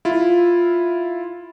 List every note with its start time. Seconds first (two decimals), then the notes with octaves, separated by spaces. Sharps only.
0.05 E4 F4